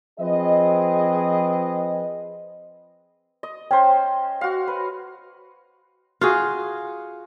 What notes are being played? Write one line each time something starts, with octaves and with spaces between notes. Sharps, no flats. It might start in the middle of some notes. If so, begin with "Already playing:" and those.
F3 C4 G#4 B4 D#5
D#5
C#4 C5 G5
F#4 F5
B4
F4 F#4 G#4